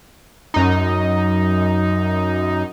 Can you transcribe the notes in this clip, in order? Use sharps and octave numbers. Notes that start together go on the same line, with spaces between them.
F#2 D#4